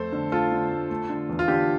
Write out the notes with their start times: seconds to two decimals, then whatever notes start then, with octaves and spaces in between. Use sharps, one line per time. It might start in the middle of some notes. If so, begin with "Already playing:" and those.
Already playing: F2 A3 A4 C5
0.13 D3
0.32 A3 F4 A4
0.52 D3
0.71 A3
0.90 A3
1.10 D3
1.29 E2
1.39 F4
1.48 D3 G4